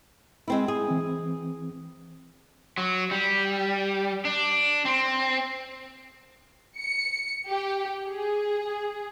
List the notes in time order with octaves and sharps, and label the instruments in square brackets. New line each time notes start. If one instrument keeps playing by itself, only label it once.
[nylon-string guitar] G#3 C4 E4
G#4
[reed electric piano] E3 C4
[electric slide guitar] F#3
G3
D4
C4
[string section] C#7
G4
G#4